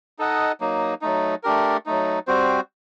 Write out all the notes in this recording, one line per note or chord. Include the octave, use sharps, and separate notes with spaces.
D#4 A4 D#5 F#5
F#3 A#3 D#4
F#3 A3 D#4
A3 D4 G4 A#4
F#3 A3 D#4
G3 C4 F#4 C5